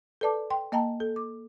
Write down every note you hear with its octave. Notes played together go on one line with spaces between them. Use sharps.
A4 B4 D5 A5 D6
G5 C6
A#3 D#5 G5 A5 A#5
A4
D6